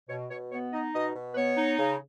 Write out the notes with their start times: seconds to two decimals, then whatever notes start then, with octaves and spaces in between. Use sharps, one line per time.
0.09 B2 C#5
0.30 B2 C#5
0.51 B3 C#5
0.73 D#4 D#5
0.94 B2 D#5
1.15 B2
1.32 B4
1.36 B3 C#5
1.58 D#4
1.79 C#3